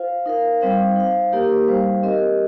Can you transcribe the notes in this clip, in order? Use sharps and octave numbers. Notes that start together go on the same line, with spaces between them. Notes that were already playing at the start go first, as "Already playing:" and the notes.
Already playing: F4 C5 F5
D#4 A#4 F5
G3 C4 D#4 C5 F5
D#4 C5 F5
A#3 D#4 G4 A#4
G3 D#4 C5 F5
C4 G4 A#4 D#5